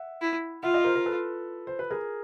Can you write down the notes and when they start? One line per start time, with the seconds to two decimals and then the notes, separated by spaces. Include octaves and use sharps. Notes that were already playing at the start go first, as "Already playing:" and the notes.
Already playing: E5 F#5
0.21 E4
0.63 F4 E5 F#5
0.74 D#5 F5
0.84 A#4 C5
0.95 A#4 C5
1.06 A4 B4
1.67 C5
1.79 B4
1.91 G#4 A#4